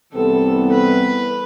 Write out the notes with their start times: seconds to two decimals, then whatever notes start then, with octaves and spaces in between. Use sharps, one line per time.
0.13 C2 C3 E3 B3 A4
0.72 B4